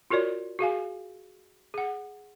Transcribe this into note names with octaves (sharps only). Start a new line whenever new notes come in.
F4 F#4 A#4 C#5 D5
F#4 G#4 F5 G#5
G#4 F#5